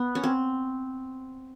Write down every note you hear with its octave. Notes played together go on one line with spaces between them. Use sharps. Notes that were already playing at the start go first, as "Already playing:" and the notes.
Already playing: B3
C#4
C4